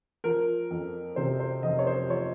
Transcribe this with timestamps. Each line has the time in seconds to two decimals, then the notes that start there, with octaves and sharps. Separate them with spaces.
0.24 F3 A#4
0.71 F2
1.16 C3 C5
1.40 C5
1.63 F1 D#5
1.79 C#5
1.86 C5
2.09 F3 C#5